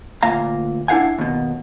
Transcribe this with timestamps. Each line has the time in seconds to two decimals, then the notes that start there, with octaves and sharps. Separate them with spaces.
0.23 D2 A#2 F5 A#5
0.88 D4 E4 B4 F5 F#5 G#5
1.19 D#2 B2